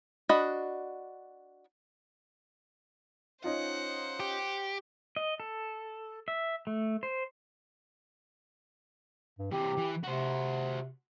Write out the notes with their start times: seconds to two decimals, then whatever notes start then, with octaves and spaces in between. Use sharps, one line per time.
0.29 D4 F#4 D#5 B5
3.44 C#4 D#4 F4 C5 F#5
4.20 G4
5.16 D#5
5.40 A4
6.28 E5
6.67 A3
7.03 C5
9.39 G2
9.52 C3 E3 G4
9.78 E3
10.04 C3 F#4 C5